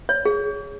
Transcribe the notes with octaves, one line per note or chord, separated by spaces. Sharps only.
C#5
G#4